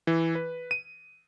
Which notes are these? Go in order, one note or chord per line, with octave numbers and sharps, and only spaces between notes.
E3
B4
D#7